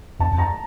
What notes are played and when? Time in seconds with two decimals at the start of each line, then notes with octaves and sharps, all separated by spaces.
0.20 F2 A5
0.32 F2
0.38 A#5